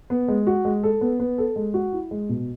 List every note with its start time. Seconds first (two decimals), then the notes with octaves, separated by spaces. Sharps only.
0.10 B3
0.28 G#3
0.47 F#4
0.65 G#3
0.83 A4
1.01 B3
1.20 B3
1.38 A4
1.56 G#3
1.74 F#4
1.93 E4
2.11 G#3
2.29 B2